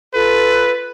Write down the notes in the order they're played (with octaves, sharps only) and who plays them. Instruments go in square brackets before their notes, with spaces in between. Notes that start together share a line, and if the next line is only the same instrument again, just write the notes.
[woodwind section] F4 A4 [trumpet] B4